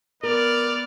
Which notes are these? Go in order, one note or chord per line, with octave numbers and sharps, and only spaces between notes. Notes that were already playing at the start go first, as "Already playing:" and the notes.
B3 A#4 D5 F6